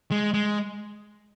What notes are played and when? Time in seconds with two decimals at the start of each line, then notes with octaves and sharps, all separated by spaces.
0.11 G#3
0.34 G#3